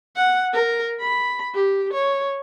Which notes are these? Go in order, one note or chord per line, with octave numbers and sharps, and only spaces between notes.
F#5
A#4
B5
G4
C#5